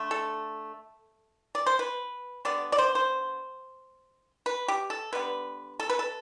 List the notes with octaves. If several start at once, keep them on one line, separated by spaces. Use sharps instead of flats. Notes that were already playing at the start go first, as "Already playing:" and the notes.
Already playing: D3 A3
A4
D5
C5
B4
D3 G3 B3 D5
D5
C5
C5
B4
G4
A4
D3 G3 B3 B4
A4
B4
A4